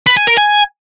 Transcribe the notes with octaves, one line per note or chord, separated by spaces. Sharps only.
B4
G#5
A#4
G#5